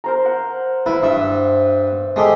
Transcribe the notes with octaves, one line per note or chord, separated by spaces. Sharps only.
A#4 C5 A#5
F#5
E4 B4 C5
G2 E5
G#3 G4 A4 E5